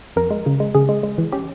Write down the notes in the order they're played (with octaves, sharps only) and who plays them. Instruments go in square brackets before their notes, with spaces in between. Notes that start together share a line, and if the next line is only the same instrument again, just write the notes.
[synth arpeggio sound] F2 A#4
G#3
C#3
G#3
C#3 G#4
G#3
G#3
E3
C#4 G4